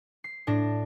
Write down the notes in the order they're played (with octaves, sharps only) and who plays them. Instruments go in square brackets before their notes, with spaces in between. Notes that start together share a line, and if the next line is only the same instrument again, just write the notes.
[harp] C7
A2 D4 A#6